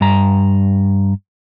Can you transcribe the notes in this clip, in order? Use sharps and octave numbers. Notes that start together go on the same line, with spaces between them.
G2 A#5